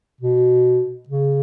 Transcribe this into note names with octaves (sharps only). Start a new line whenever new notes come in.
B2
C#3